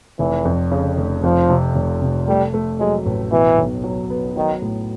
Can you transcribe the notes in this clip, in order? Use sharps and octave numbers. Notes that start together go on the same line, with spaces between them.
F1 E3
F2
C#3
F1
F2 F3
C3
F1
C3
G3 A3
A3
F#3 G#3
A1
B2 E3
B1
F#3
B3
D#3 F#3
A2